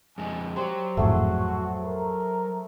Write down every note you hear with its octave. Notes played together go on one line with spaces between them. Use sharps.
F2 G#3 G#5
F#3 G4 C5 D5
G#1 F2 A2 A3 F#4 G#4
A#4